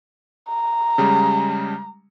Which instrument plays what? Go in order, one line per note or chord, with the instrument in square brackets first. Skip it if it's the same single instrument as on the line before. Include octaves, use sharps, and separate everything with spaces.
[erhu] A#5
[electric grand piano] C#3 G3 G#3